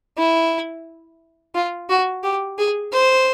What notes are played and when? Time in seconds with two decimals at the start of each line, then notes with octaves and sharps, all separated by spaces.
0.18 E4
1.55 F4
1.90 F#4
2.24 G4
2.58 G#4
2.93 C5